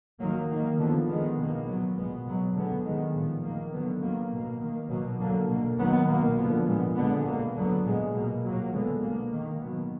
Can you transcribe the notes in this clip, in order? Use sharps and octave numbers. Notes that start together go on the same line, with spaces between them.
D#3 F#3 A#3
D#3 A#3
D3 F3 B3
D#3 G#3 B3
B2 A#3
A#2 F#3 B3
B2 G#3 B3
B2 F#3 B3
D3 G#3 B3
D#3 G#3 B3
A#2 F3 B3
D#3 A#3
D3 F#3 B3
D#3 F#3 A#3
B2 A#3
D#3 A#3
B2 F#3 A#3
D3 F#3 A#3
B2 A#3
D#3 F#3 B3
B2 A#3
D3 F3 B3
A#2 G#3 B3
D3 G#3 B3
B2 A#3
D3 F#3 B3
A#2 G#3 B3
B2 A#3
A#2 F#3 A#3
D3 G#3 B3
B2 A#3
D#3 A#3
B2 F#3 B3